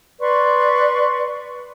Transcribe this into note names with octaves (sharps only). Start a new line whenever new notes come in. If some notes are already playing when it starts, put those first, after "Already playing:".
B4 D5 C6 C#6